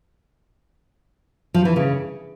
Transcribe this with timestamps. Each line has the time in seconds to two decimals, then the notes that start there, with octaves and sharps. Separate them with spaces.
1.54 F3
1.65 E3
1.76 C#3